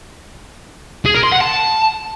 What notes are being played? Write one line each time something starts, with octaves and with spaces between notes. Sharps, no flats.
G#4
A#4
C6
F#5
A5